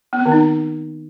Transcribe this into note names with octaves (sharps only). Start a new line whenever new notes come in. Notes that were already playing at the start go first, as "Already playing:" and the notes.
B3
C4
D#3
D#4